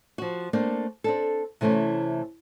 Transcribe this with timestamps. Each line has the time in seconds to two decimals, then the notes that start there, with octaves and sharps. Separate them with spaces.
0.18 F3 F#4
0.53 A3 A#3 C4 D4
1.04 C4 D4 A4
1.61 C3 E3 A3 C4 C#4